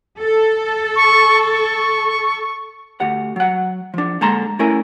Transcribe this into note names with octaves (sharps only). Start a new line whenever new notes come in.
A4
C#6
C#6
D2 G4 F#5
F#3 F#5
F3 D4
D3 G#3 A#3 A5 A#5 C6
A3 C#4 E4 A#4 G#5